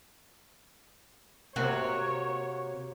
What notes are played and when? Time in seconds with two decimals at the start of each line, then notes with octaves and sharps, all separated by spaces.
1.56 C3 A#3 F#4 A#4 C5 C#5